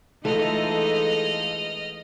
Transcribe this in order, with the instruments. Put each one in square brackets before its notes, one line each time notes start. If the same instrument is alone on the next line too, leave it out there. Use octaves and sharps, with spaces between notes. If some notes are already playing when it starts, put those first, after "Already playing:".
[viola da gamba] E3 G#3 D#4 [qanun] A3 [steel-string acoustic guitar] F4 A4 [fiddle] D#5 F6